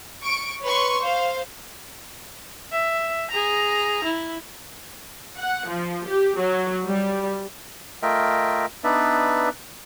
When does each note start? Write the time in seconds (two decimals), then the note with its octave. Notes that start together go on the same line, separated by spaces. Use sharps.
0.22 C#6 D7
0.62 B4 C#5 C6 C#6
1.00 C5 F5
2.73 E5
3.31 G#4 A#5
4.04 E4
5.39 F#5
5.68 F3
6.06 G4
6.38 F#3
6.84 G3
8.03 A3 F4 A#4 D#5 E5 G5
8.84 B3 D4 D#4 B4 D5 E5